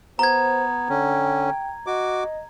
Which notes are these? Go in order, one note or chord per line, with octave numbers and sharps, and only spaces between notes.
B3 C5 A#5 G#6
D3 C#4 G5
F#4 D#5 D6